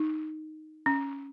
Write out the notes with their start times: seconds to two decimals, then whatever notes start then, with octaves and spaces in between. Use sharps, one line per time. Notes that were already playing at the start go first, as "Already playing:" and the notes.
Already playing: D#4
0.86 C#4